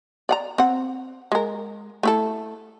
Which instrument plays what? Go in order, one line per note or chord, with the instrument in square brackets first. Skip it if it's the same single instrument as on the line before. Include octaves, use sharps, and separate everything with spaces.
[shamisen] D5 F#5 A#5
C4 F#5
G#3 A#4
A3 E4 A4